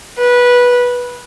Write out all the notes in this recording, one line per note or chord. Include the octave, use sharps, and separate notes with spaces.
B4